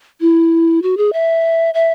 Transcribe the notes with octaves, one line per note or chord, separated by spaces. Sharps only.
E4
F#4
G#4
E5
E5